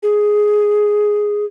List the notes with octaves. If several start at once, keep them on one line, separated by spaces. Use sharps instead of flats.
G#4